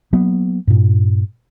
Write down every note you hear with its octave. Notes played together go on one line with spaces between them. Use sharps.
F#3 A#3 B3
G2 A#2